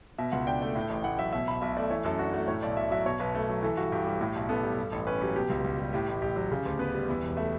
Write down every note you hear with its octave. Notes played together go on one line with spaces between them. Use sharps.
B2 E5
C#2 F#5
D4 G5
A3
A2
A1
A1 F#5
F#3 E5
B2 E5
B1 B5
B1 E5
A3 D5
E3 C#5
F#2 A4
D4 F#4
A3 F#4
A2 C#5
B1 D5
B1 E5
F#3 E5
B2 C#5
B1 B4
A3
F#3
E3 A4
G2 F#4
G2 G4
G3
A2
B1
B3 A4
G3
G2
A1
C#4 B4
F#3 G4
B2 G4
C#2
C#2
G3
A2 G4
A1
A1 G4
F#3
C#3
D2
B3 B4
G3
E2
E1
A3 E5